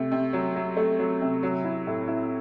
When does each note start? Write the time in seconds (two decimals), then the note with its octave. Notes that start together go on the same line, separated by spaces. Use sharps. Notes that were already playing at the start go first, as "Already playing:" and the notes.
Already playing: C3 A3
0.12 C3
0.33 F#3
0.56 F#3
0.77 A3
0.99 F#3
1.21 C3
1.43 F#3
1.64 E4
1.87 A2
2.08 E4